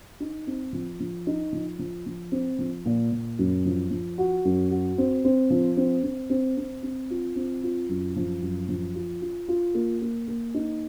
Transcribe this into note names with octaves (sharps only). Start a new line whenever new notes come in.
D#4
C4
F3
F3
D#4
F3
F3
F3
C4
F3
A#2
A#2
F#2
F3
F3
F#4
F#2
F#4
C4
C4
F3
C4
C4
C4
C4
C4
F4
C4
F4
F#2
F3
F#2
F3
F4
F4
F4
A#3
A#3
A#3
D#4